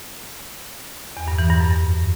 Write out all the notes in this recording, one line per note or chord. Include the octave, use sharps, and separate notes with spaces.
E2
G2
E3
G2
F#2